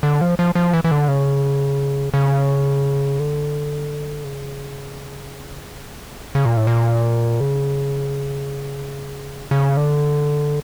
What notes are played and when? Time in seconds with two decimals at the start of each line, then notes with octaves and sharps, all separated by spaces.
0.03 D3
0.21 F3
0.39 F3
0.55 F3
0.73 E3
0.84 E3
0.91 D3
1.08 C#3
2.14 C#3
3.19 D3
4.24 C#3
6.35 C#3
6.45 A#2
6.57 A2
6.67 A#2
7.40 C#3
9.51 C#3
9.77 D3